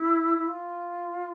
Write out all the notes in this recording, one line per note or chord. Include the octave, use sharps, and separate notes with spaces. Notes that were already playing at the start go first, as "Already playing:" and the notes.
Already playing: E4
E4
F4